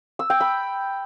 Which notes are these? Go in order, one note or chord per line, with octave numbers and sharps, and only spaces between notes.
E6
G5
B5